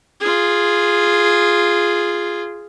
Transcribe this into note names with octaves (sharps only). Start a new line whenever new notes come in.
F4 G#4